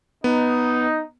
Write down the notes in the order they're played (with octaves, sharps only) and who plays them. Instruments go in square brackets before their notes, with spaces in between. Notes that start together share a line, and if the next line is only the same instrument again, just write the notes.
[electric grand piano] B3 [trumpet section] D#4